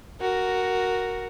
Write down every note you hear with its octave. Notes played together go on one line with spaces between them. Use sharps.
F#4 A#4